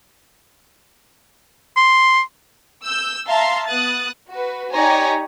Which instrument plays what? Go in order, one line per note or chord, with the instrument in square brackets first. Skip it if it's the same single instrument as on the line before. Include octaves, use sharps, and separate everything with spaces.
[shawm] C6
[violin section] E6 G6
E5 F5 A5 A#5 C6
B3 D#6 F#6 A6
F#4 B4
D#4 G4 C#5 D5 G#5 A#5